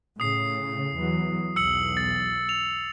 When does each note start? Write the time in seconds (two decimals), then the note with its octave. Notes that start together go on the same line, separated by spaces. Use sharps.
0.20 A2 C#3 D#6 C7
0.96 E2 E3 F#3
1.56 B1 E2 E6 C#7 F#7
1.97 A6
2.49 F7